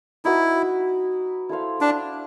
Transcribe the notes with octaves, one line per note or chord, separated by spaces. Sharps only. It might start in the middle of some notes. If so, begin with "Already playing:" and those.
D#4 E4 F#4 B4
E4 A4 C5 F5
D4